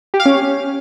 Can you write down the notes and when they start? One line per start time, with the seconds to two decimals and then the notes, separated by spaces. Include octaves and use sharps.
0.14 G4
0.20 F5
0.25 C#4